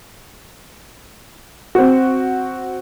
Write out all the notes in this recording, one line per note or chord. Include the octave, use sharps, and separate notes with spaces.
C4 F#4